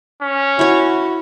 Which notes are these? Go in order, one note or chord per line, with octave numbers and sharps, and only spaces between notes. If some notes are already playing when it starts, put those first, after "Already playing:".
C#4
E4 F#4 C#5